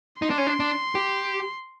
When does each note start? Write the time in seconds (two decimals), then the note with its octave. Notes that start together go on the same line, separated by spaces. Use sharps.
0.22 D#4 C6
0.30 D4
0.38 C#4
0.47 D4
0.60 D4
0.95 G4